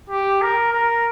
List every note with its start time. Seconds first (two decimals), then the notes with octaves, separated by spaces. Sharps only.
0.10 G4
0.42 A#4
0.73 A#4